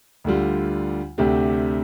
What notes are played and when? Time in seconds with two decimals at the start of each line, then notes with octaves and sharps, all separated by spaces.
0.24 D2 D3 G3 F4
1.18 D2 C3 A3 D4 G4